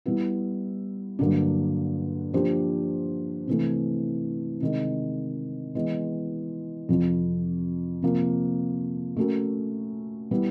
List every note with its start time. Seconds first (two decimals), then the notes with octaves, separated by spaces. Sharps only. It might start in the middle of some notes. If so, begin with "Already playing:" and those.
0.06 G3 B3 E4
1.19 G2 D3 F#3 A#3 D4
2.33 F3 A#3 D4 G4 C5
3.47 C3 E3 A3
4.61 C3 D#3 G#3
5.75 E3 G#3 B3
6.89 F2 C3 F3
8.02 C3 F3 A#3
9.17 A3 C#4 F#4 A#4
10.31 G3 B3 E4